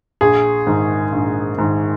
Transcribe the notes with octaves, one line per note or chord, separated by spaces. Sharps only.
A#1 G#4
G#2 D#3
A#1
G#2 D#3